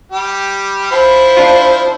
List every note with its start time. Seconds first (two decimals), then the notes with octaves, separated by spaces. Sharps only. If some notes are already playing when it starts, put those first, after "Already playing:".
0.12 G3 G4
0.91 F3 E4 C5 B5
1.37 D4 F4